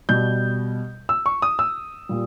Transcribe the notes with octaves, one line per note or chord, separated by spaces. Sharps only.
B2 G3 G6
E6
C#6
D#6
E6
A#2 G3